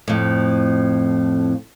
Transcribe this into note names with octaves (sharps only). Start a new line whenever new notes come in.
F2 A2